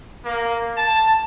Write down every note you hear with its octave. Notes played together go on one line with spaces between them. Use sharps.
A#3
A5